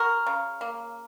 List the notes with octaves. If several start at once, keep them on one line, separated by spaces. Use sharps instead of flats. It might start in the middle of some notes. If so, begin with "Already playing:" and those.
Already playing: F#4 A#4
C#3
A#3